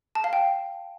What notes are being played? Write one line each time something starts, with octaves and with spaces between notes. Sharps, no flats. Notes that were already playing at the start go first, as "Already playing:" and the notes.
A5
F5
G5